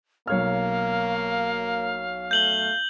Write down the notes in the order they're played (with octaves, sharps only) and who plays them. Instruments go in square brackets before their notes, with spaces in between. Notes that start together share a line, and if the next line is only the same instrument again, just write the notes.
[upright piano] B1 C#5 F6 [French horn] A#3 [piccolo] F5
[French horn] A3 [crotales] G6 F#7 G7